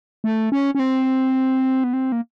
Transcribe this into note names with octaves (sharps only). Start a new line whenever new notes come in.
A3
C#4
C#4
C4
B3
C4
A#3